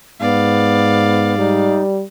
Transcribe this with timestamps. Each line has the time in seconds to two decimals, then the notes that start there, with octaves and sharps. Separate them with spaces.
0.21 G#2 B3 D5 F5
1.38 G3 D#4